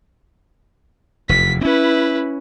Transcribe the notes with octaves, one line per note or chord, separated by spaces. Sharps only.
F1 E2 B6
C4 C#4 E4 B4